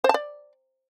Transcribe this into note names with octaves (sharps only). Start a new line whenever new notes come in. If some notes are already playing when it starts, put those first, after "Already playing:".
C5
A5
D5